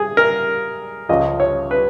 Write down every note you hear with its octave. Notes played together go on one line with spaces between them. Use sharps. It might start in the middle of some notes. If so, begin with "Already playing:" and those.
Already playing: G#4
A#4
C#2 C#3 F3 D#5
C#5
B4